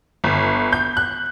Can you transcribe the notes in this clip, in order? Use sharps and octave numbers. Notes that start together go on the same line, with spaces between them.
G1
G6
F#6